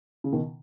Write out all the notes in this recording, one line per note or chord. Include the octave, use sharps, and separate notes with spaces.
C#3
B2 D#3